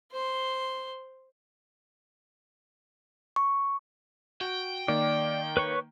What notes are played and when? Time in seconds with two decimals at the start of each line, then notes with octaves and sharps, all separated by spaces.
0.11 C5 C6
3.36 C#6
4.41 F#4 G5
4.88 D#3 A#3 D5
5.57 B4 C#5 C#6